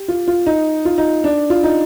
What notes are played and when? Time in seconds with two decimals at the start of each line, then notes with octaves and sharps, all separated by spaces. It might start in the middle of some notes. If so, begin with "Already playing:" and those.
Already playing: G4
0.08 F4
0.28 F4
0.46 D#4
0.85 F4
0.98 D#4
1.24 D4
1.50 F4
1.63 D#4